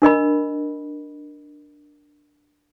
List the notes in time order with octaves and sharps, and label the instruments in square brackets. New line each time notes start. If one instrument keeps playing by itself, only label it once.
[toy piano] D4 A#4 D#5 B5